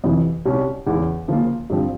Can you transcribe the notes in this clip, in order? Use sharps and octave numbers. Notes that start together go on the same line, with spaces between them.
F2 C3 E3
C2 C3 G3 C#4
E2 C#3 E3
C#3 F3 A#3 C#4 F4
G2 F3 C4